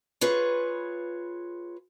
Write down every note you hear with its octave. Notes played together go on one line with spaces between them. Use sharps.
F4 G#4 B4 C#5